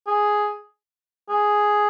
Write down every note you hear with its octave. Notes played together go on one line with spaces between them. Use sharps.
G#4
G#4